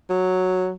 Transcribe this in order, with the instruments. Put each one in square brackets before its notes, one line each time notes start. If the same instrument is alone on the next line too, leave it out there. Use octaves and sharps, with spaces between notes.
[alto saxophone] F#3